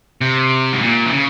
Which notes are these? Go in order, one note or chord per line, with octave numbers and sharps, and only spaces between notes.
C3
G#2
A#2
E3
C#3